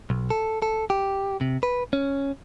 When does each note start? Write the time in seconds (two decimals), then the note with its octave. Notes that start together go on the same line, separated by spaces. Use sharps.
0.10 B1
0.30 A4
0.62 A4
0.90 G4
1.41 C3
1.63 B4
1.93 C#4